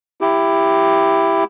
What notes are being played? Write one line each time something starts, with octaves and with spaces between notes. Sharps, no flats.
E4 G4